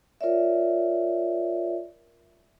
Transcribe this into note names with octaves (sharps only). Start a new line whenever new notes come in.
F4 A#4 C#5 D5 E5